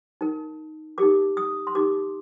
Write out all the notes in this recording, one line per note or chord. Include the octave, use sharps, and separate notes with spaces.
D#4 A#4
D#4 G4 A#4 D6
D#6
C6
D#4 G4 A#4 D6